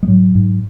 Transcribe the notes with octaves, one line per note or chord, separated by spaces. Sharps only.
G#3
G#2 F#3
G#2